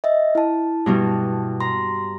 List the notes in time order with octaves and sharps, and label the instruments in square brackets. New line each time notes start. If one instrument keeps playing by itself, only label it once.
[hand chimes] D#5 E5
E4 A5
[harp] G2 B2 G3
[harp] A#5 [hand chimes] C6